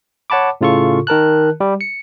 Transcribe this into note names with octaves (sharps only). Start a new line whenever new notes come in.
C#5 F#5 A5 B5 D6
A2 C#3 F4 A4 C#6
D#3 A#4 A5 F#6
G3 G4
C#7